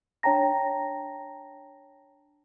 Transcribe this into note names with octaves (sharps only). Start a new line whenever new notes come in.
D4 C#5 G5 A5 A#5 A#6